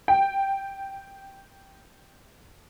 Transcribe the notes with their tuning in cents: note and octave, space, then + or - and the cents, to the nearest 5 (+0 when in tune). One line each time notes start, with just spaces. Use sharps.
G5 +0